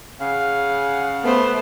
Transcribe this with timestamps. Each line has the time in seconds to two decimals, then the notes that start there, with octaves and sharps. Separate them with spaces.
0.21 C#3 F5 F#5
1.24 A3 B3 B4 C5